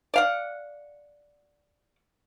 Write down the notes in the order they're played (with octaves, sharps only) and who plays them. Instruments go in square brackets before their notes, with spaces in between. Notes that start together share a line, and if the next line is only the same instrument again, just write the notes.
[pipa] D5 F5 F#5